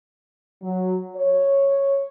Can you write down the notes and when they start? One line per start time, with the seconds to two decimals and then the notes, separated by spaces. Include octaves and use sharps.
0.62 F#3
1.17 C#5